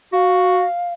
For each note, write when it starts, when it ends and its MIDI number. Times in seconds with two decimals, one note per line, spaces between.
0.13 0.65 66
0.13 0.94 77